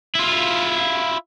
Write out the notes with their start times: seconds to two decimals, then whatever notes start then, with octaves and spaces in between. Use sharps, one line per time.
0.15 E4 F4